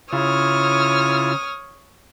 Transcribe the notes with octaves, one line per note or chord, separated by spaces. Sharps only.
C#3 E4 F4 C#5 D#6 F6